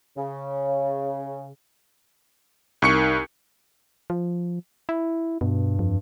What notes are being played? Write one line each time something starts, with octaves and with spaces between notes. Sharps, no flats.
C#3
C2 D#4 A#4 C#6 C#7
F3
E4
G2 B2
F2